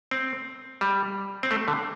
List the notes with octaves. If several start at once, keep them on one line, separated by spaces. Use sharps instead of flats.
C4
G3
C4
A3
D3